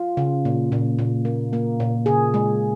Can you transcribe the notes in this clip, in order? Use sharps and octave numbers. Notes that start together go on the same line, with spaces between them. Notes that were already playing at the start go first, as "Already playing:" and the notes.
Already playing: F4
C#3
A#2
A#2
A#2
A#3
A#3
A#2
C#3 G#4
G#3